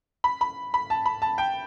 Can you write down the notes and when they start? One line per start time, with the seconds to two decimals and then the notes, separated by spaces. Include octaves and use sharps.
0.24 B5
0.41 B5
0.74 B5
0.90 A5
1.06 B5
1.22 A5
1.38 G5